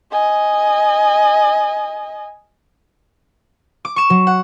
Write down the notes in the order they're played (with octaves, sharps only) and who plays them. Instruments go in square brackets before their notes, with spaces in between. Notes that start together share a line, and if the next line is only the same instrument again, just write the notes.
[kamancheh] D#5 G#5
[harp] D6
C#6 E7
F#3
F#5